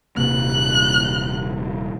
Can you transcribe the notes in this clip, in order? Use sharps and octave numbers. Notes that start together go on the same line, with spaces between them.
D#1 C3 A#3 F#6